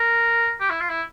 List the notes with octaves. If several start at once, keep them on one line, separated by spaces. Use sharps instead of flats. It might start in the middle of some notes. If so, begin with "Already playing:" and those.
Already playing: A#4
G4
E4
F4
E4